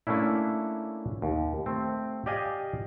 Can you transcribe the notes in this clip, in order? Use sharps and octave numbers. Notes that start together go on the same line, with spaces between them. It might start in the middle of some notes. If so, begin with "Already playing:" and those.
A3 A#3 C#4 D4 E4
D#2
A3 C4
G4 D5 D#5 F5 G#5